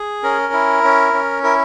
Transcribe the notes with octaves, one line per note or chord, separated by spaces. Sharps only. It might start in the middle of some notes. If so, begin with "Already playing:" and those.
Already playing: G#4
C#4 A#4
E4
C#4
C#4
E4 A#4